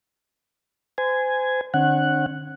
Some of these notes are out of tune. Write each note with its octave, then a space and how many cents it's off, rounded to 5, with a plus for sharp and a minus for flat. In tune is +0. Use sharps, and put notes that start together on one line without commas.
C5 -35 G#5 +0
D3 +30 C#4 -45 F#5 +0